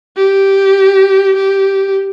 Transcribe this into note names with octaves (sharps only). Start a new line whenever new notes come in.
G4
G4